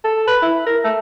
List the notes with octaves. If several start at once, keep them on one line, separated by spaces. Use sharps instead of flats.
A4
B4
E4
A#4
A3